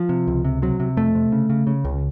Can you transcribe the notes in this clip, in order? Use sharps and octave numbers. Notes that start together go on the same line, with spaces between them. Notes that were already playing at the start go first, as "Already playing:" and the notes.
Already playing: F3
C3
C#2
C3
C3 F#3
C3
F2 A3
C3
C#3
C#3
C#3
C#2